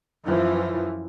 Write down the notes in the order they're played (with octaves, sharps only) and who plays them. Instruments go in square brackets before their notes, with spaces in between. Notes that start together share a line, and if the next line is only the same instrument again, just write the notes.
[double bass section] F#2 E3 F3